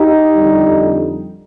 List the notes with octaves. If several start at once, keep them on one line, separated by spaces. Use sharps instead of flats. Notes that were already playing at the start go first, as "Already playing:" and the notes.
Already playing: D#4 G4
F2 D3 G3